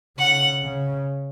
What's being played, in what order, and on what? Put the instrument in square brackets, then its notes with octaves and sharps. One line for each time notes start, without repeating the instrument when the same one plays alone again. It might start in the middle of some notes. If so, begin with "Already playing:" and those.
[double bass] C#3 [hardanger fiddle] F#5
[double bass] C#3